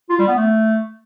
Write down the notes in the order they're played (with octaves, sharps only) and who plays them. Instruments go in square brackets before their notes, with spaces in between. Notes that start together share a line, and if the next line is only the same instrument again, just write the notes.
[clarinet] F4
G3
B3
A3